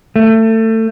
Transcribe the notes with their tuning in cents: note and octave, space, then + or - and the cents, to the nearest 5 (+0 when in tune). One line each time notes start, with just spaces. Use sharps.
A3 +25